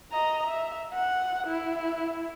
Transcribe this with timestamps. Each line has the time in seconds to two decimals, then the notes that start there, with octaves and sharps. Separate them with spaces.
0.12 D#5 A#5
0.47 E5
0.93 F#5
1.47 E4